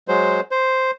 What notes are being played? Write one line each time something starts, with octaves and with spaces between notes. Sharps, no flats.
F#3 G#3 C5
C5